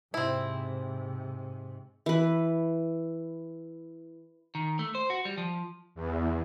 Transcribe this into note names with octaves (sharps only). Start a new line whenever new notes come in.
G#2 C3 C4 E4
E3 B4
D#3
A3
C5
F#4
G3
F3
E2